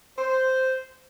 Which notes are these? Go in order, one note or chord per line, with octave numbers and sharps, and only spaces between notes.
C5